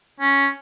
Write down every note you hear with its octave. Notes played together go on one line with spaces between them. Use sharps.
C#4